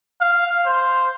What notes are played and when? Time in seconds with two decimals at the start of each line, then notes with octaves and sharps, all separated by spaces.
0.21 F5
0.65 C5